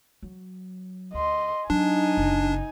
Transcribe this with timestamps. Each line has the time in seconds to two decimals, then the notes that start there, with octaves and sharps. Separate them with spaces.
0.23 F#3
1.14 D2 D#5 C6
1.70 F#3 D4 D#4 G#5
2.17 F#1 C#3